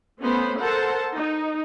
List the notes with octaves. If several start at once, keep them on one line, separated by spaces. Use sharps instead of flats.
A3 B3 C#4 C5 B5
A4 A#4 C5 F#5 A5
D#4